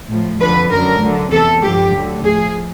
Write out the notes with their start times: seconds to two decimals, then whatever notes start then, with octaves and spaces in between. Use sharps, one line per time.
0.10 A2 F3
0.40 F2 D3 F3 B4
0.71 F#2 D3 F#3 A#4
1.01 D2 D3 F#3
1.32 E2 C3 E3 A4
1.63 G2 D3 F3 G4
1.94 D2 D3 F#3
2.24 A2 F3 G#4